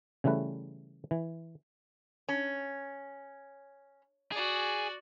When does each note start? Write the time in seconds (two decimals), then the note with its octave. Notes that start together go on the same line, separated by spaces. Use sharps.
0.24 C#3 E3 G3 A3 B4
1.11 E3
2.29 C#4
4.32 F#4 G#4 D5